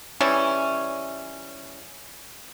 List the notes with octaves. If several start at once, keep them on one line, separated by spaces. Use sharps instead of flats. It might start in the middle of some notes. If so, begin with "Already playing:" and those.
E3 G3 C#4